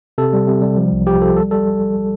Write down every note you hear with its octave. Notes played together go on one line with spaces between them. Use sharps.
C3 A4
G3
C3
G3
F3
C2
F3 G4
F3 A4
G3 A4
G3 A4